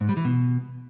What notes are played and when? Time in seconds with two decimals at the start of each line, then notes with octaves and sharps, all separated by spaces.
0.01 G#2
0.09 G3
0.17 E3
0.25 B2